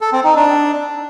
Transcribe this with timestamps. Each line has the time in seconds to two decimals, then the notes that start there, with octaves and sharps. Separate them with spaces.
0.01 A4
0.13 C4
0.24 D#4
0.36 D4